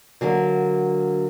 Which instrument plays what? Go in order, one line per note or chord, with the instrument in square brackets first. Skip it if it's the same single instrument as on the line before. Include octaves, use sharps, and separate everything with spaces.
[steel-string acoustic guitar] D3 F#3 A#3